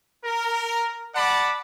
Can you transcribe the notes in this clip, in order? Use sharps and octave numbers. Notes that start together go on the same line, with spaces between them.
A#4
D5 F#5 A5 B5 D6